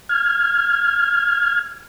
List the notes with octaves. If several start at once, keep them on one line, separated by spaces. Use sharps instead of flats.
F6 G#6